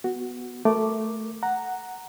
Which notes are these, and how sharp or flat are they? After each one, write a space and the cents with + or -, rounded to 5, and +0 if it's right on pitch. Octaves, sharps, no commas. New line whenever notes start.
B3 +0 F#4 +0
A3 +0 A#4 +0 D6 +0
F#5 +0 A#5 +0